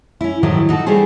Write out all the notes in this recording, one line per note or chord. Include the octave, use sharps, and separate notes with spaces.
C#4 E4
A2 D#3 F3 F#3 E4 G4
D#4 F#4 A4
G3 A3 D4 F#4 G#4 C5